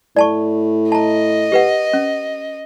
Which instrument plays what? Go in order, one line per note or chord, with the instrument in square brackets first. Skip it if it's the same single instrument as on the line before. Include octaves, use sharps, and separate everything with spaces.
[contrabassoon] A2 [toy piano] D5 A5 C#6
[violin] D#5 [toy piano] A5 A#5
[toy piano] G4 B4 F#5
C#4